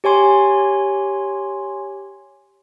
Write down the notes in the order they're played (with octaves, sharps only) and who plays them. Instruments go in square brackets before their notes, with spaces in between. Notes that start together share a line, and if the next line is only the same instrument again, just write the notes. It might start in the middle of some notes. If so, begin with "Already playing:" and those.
[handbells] G4 C#5 G#5 C6